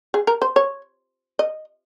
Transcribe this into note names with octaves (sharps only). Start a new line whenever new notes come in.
G#4
A#4
C5
C#5
D#5